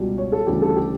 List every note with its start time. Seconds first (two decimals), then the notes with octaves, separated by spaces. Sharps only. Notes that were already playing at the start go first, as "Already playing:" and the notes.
Already playing: C#2 B2 G3
0.18 C#5
0.32 A4
0.47 D2 C#3 E3 G3 G4
0.62 A4
0.76 G4